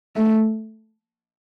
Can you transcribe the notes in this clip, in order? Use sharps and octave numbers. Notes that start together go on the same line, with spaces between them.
A3